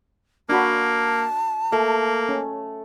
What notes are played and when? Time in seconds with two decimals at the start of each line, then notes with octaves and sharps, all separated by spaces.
0.49 A#3 D4 F#4 A5 B5
1.72 A3 A#3
2.29 C#4